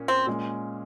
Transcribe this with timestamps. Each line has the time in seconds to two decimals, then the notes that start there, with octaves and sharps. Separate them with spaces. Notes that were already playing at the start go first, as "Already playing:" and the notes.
Already playing: A#2 A#3 C#4
0.08 C4
0.27 A#2 G#3 C#4